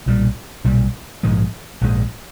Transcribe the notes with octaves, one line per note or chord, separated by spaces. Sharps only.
B1 A#2 G3
B1 A#2 G3
A#1 G#2 F3 G#3
A#1 G#2 F3 G#3